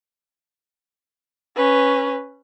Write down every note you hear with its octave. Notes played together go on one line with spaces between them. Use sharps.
C#4 B4